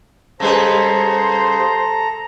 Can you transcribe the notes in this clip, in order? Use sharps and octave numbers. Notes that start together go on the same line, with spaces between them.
C#3 G3 A4 B4 C5 A#5